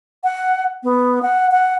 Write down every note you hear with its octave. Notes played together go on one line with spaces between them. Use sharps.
F#5
B3
F#5
F#5